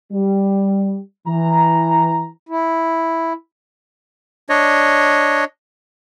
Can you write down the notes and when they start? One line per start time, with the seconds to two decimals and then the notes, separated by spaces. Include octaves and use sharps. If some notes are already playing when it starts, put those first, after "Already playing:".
0.12 G3
1.27 E3 A#5
2.49 E4
4.49 D4 C#5 D#5